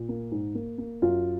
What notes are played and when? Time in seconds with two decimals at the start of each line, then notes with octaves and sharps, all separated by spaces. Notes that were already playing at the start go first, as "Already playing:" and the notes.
Already playing: A#2
0.09 A#3
0.32 G#2
0.55 A#3
0.78 A#3
1.02 F#2 F4